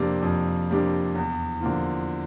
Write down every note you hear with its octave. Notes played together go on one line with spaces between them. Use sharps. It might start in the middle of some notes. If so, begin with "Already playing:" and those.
Already playing: F2 C3 G3 A#3 D4
F2
C3 G3 A#3 D4
E2
D3 F3 A#3 F4